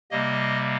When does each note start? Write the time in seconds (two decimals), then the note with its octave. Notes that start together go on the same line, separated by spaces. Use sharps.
0.11 C3 G3 A#3 D#5